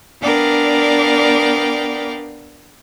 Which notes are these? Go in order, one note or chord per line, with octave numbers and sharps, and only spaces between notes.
B3 D4 A#4 D5 F5 G5